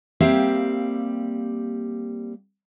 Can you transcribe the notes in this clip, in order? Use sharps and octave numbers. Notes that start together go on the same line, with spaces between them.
G3 A#3 C4 G4 E5 F5